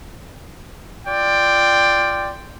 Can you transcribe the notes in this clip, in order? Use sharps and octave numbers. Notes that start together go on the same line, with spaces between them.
F4 D5 G5